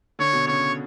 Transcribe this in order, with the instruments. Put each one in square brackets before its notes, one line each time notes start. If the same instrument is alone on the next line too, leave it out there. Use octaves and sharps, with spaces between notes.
[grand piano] D3 [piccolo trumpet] C#5
[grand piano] B2
[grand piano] C#3 [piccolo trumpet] C#5